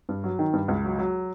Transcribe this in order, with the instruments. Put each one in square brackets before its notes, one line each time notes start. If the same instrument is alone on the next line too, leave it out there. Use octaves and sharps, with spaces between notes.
[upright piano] G2
F#3
D#3
G2
C#2
F#3
F#3